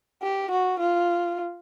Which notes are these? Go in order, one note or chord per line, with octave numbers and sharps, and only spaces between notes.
G4
F#4
F4